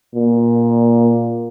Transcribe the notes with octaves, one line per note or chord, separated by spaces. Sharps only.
A#2